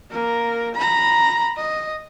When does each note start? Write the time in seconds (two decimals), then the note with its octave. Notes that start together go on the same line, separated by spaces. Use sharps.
0.11 A#3 A#4
0.75 A#5 B5
1.56 D#5